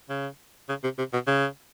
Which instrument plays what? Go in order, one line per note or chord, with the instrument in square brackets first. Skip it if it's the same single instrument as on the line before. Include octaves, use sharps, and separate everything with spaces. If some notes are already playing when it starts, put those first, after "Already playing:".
[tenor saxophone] C#3
C#3
C3
C3
B2
C#3